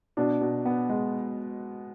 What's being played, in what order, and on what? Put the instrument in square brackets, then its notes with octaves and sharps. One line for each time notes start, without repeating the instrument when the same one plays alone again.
[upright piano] B2 [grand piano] D4
[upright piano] B2
B3
G#3